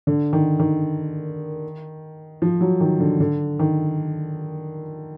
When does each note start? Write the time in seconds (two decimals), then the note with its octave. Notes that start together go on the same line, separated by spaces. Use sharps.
0.07 D3
0.33 D#3
0.60 D#3
2.42 F3
2.61 F#3
2.80 D#3
3.00 D3
3.20 D3
3.59 D#3